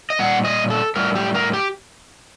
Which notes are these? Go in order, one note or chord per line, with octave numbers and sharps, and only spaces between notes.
D#5
A#2 G3 F#5
D#5
A4
A2 G3 A#4
G4
A#4
G4